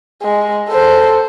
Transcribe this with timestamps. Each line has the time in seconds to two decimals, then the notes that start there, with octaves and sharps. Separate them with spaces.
0.22 G#3
0.69 A4 C5